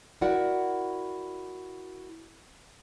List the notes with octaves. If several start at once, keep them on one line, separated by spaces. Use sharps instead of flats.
E4 F#4 A#4 D5 F#5